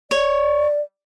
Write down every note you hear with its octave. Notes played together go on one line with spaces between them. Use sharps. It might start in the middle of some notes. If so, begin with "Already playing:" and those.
C#5 D5